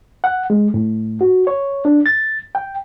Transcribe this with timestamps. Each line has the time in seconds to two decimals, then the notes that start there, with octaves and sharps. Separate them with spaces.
0.24 F#5
0.50 G#3
0.74 A2
1.21 F#4
1.47 C#5
1.85 D4
2.06 A6
2.55 G5